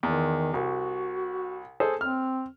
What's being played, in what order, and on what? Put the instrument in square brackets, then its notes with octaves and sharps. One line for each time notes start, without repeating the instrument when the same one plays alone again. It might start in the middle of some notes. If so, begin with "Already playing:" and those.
[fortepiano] E2 [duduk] D#3
[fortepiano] C2 [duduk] F#4
[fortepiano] G#4 A4 C5
[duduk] C4 [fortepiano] F6